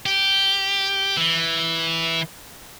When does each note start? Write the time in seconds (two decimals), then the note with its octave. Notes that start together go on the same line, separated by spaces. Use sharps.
0.06 G4
1.17 E3